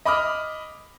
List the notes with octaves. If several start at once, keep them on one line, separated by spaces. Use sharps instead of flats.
D#5 B5 D6 D#6 F6